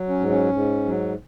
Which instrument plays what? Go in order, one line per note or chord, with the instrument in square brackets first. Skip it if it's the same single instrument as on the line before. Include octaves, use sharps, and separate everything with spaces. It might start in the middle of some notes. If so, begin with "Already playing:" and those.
Already playing: [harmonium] F#3
C#4
G#2
C#4
G#2
F#3